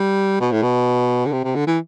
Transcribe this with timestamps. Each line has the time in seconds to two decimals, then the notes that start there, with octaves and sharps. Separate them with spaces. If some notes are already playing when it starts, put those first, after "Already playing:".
Already playing: G3
0.40 B2
0.52 A2
0.63 B2
1.26 D3
1.32 C3
1.44 C3
1.55 D3
1.67 E3